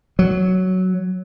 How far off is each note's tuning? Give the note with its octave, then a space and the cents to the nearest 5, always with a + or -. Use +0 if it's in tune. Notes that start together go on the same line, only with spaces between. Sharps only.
F#3 +5